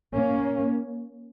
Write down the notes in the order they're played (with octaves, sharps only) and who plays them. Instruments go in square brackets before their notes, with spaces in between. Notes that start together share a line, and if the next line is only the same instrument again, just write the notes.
[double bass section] A#3 C#4